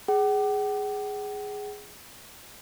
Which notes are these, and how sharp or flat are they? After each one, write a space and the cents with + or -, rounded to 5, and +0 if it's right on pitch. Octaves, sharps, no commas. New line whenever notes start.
G#4 +0 F#5 +45